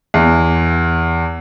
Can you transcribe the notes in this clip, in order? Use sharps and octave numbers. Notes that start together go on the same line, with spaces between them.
E2